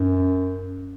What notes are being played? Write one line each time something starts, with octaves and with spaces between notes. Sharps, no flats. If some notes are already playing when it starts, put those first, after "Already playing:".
Already playing: F#2